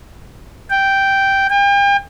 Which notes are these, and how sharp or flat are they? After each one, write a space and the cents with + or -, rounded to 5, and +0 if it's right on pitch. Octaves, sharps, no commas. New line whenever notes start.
G5 -5
G5 +40